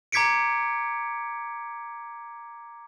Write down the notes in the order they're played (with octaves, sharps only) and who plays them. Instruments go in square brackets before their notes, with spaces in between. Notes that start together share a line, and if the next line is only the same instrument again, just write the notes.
[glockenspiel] A#5 D6 G#6 B6 C#7 D7